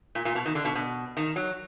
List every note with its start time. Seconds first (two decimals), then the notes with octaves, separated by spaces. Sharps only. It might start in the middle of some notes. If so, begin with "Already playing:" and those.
0.15 A#2
0.25 A#2
0.35 B2
0.46 D#3
0.55 D3
0.65 B2
0.75 B2
1.17 D#3
1.36 F#3